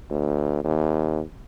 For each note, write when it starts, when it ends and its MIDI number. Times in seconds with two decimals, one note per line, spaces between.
0.11 0.60 38
0.64 1.20 39